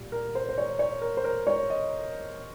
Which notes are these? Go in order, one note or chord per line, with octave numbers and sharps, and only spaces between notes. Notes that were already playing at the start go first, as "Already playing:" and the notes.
Already playing: A#2 G3
A#4
C5
C5
C#5
C#5
A#4
C5
A#4
C#5
D#5